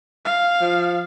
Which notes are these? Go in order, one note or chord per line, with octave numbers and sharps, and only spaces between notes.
F5
F3